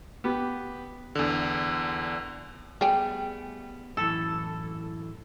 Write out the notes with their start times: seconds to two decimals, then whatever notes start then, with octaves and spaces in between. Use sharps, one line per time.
0.24 B3 G4
1.15 E2 D3
2.81 G3 A3 B3 G#4 G5
3.97 F#2 A2 E3 A4